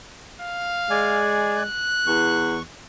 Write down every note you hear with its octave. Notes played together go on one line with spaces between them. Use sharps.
F5
G#3 D5 G#5
F#6
E2 C#6